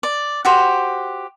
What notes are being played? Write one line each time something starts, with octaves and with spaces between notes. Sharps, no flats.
D5
F#4 G4 C5